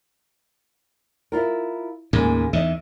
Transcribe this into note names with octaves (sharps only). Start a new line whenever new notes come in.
E4 F4 A#4
D#2 A2 C#3 G#3 A#3
E2 D#3 D#5 E5